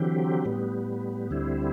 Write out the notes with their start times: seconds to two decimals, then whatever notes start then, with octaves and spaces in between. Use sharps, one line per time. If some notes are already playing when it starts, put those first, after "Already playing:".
Already playing: D3 E3 F#3 C4 G4
0.45 A2 G3 B3
1.31 D2 D3 G3 C4 E4